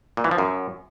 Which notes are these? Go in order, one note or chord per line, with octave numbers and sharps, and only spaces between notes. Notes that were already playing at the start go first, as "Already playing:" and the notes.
A#2
E3
F3
F#2